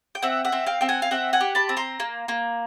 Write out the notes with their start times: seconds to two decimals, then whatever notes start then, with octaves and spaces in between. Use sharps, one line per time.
0.15 G5
0.22 C4 E5 F#5
0.45 E5 F#5
0.52 C4
0.67 F5 G5
0.81 C4 G5
0.89 F#5 G#5
1.02 F5
1.11 C4 E5 F#5
1.33 F#5 G#5
1.41 G4
1.55 A5 B5
1.69 C4
1.77 A#5 C6
2.00 A#3
2.28 A#3